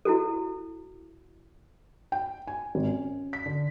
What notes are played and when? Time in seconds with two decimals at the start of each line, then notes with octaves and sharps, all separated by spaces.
0.05 E4 F#4 A4
2.12 G5
2.47 G#5
2.75 G#1
2.87 C#4
3.33 B6
3.46 D3